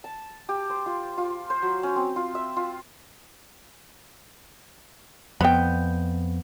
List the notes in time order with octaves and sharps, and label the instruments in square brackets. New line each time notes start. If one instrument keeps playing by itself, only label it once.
[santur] A5
G4
C5
F4
F4
C5
F#3
C#4
C4
F4
E5
F4
[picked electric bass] F2 [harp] B3 G6 [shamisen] G5 B5